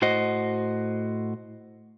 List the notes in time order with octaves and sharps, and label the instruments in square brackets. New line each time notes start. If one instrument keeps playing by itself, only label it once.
[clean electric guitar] A2 F#4 C5 D#5